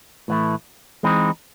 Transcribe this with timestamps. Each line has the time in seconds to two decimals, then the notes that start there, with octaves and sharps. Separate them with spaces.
0.28 A2 E3 A3
1.03 E3 G#3 C4 D#4